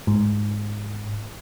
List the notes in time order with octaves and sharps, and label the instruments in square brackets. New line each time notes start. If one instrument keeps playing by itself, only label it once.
[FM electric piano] G#2